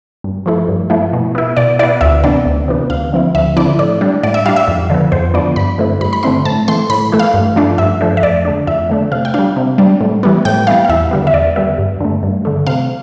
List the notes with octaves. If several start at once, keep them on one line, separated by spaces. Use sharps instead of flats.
G2
F3 A3 E4
G2
F3 A3 E4
B2
B3 E4
B2 D5
B3 E4 D5
D2 E5
C3 E3 B3 D4 D5
D2
C3 E3 B3 D4
D2 F5
D3 F3 C4 E4
D2 E5
D3 F3 C4 E4 D5
A2 D5
G3 D4
A2 D5
E5
G3 D4 F5
E5
F2
D3 F3 B3
F2 C5
D3 F3 B3 D5
G2 B5
D3 A3 C4 E4
G2 B5
B5
D3 A3 C4 E4 C6
A2 A5
E3 A3 C6
A2 B5
E3 A3
F5
G2
F3 A3 D4
G2 E5
F3 A3 D4
E5
F2 D5
D3 A3 D4
F2 E5
D3 A3 D4
C3 F5
G5
G3 D4 F5
C3
G3 D4
A2
E3 G3 B3
A2 G5
E3 G3 B3 F5
F5
E2 E5
D3 G3 B3
E5
E2 D5
D3 G3 B3 E5
G2
D3 A3
G2
D3 A3
C3 F5